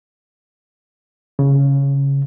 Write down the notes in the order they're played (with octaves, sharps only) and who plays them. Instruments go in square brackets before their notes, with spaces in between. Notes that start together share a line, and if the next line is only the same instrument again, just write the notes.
[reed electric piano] C#3